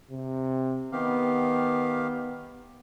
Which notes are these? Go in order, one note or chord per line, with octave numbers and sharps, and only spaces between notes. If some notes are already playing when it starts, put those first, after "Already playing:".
C3
D#3 B3 G4 F5